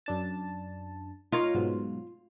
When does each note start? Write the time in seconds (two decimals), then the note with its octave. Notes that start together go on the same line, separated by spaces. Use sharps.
0.06 F#2 D4 A5
1.32 D#4 F4 A#4 C#5
1.55 G#2 B2 F#3